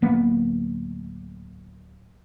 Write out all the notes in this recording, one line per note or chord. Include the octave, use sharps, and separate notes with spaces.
D1 A#3 B3